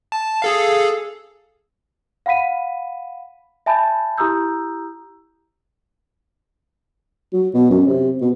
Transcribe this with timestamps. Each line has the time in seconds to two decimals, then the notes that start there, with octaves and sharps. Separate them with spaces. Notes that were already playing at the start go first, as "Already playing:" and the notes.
0.12 A5
0.42 G#4 A4 F5
2.26 F5 F#5 B5 B6 D#7
3.66 E5 G#5 A5 B5 G6 A6
4.17 E4 G4 A#5 D#6 E6 G6
7.33 F#3
7.54 B2
7.70 F#2
7.87 C3
8.21 B2